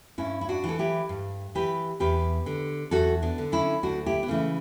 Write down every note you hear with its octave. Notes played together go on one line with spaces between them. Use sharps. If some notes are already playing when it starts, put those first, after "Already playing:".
G2 C#4 E4
E4
D4 F#4
E3
A4
E4 G4
G2
E3 G4 B4
E2 G4 B4
D3
E2 F#4 A4
B3 D4
D3
C#4 E4
D2 D4 F#4
E4 G4
B3
C#3 E3 A3